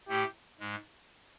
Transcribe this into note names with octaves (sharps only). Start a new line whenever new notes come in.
A2 A3 G4
G#2 G#3